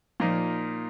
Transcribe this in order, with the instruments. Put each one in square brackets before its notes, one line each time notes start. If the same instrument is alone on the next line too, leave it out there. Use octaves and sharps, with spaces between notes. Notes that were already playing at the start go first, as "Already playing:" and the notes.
[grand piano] A#2 A#3 D#4 [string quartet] F3